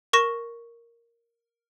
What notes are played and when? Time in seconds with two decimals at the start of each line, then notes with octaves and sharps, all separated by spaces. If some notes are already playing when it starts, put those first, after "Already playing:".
0.13 A#4 C#6 A#6 E7